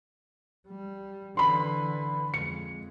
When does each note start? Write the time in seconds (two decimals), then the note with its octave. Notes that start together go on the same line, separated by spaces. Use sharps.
0.68 G3
1.37 D3 E3 B5 C6
2.34 F2 G#3 C#7